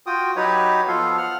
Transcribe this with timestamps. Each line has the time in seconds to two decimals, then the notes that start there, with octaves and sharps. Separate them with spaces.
0.06 F4 F#4 G5 D#6
0.36 F#3 D#4 F#4 G4 B4 C#5
0.88 F3 B3 F4 A4 F5
1.18 F#5 F6